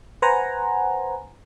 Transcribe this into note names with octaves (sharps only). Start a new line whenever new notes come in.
B4 C5 F#5 G#5 A#5